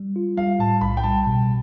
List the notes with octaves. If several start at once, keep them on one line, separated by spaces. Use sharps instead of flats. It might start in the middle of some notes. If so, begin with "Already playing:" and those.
Already playing: G3
F4
G3 F5
A2 A5
B1 B5
G5
G3 A5
B2